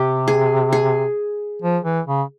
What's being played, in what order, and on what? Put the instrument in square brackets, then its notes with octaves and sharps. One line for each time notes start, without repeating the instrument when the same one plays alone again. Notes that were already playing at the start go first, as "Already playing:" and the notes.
Already playing: [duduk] C3 [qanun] G4
[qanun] G#4
G#4
[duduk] F3
E3
C#3